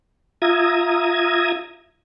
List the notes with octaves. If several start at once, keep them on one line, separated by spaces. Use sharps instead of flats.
F4 E5 A#5 D#6 G#6